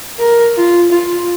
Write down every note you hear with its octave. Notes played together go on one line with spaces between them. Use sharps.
A#4
F4
F4